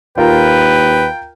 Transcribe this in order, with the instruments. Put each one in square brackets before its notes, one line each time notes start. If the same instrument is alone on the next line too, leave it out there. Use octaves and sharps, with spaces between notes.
[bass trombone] D#2 [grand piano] F4 A#4 [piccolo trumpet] B4 [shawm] G5